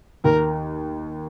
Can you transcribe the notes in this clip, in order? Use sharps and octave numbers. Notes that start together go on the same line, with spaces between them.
D#2 A#4